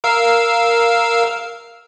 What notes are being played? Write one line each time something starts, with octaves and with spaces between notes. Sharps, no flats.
A#4 F5 E6